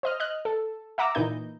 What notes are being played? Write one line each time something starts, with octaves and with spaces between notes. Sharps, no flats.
C5 D#5 F6
D#5 F6 F#6
A4
E5 F#5 A#5 D6 E6
A#2 E3 D#4 E4 D#5 G6